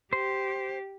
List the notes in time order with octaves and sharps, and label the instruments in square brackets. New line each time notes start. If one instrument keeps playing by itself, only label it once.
[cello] G4 [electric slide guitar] C5